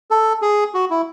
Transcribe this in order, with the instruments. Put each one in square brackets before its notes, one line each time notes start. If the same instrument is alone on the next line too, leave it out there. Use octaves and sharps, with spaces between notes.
[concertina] A4
G#4
F#4
E4